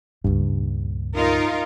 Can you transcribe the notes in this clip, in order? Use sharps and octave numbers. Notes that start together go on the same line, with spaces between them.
C#2 G2 A#2
D#4 F4 A#4